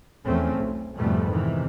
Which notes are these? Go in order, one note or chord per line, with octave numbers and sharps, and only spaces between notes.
E2 F3 A3 C4 C#4
B1
F2 G#2 B2 G3 A3 B3
C3 D#3 E3